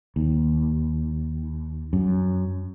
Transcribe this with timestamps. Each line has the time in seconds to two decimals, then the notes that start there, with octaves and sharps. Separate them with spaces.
0.16 D#2
1.93 F#2